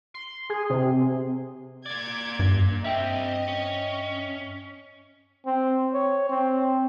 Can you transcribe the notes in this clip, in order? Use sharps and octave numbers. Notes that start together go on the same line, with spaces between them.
C6
G#4
C3
A#3 D5 D6 G#6
G2
G3 C4 D#5 E5 G5
C#4
C4
C#5
C4